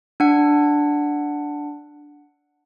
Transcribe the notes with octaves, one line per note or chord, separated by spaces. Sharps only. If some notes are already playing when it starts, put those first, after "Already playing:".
D4 F#5